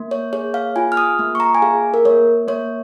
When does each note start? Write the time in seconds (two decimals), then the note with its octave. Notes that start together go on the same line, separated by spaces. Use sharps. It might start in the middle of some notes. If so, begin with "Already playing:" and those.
Already playing: A#3
0.11 C#5
0.33 G#4 C#5
0.54 F5
0.76 F4 G#5
0.92 F6
0.97 D#6
1.19 A#3
1.35 C#6
1.40 A#5
1.55 G#5
1.62 G#4 F5
1.94 A#4
2.05 A#3 C#5
2.48 A#3 C#5